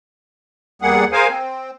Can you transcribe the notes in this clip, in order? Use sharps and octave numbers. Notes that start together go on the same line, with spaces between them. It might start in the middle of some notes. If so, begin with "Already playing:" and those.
E2 G3 A#3 G#4 F#5
G#4 A#4 C5 F5 G#5
C4